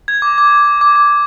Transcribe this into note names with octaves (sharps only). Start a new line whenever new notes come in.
G#6
D6
D6
D6
D6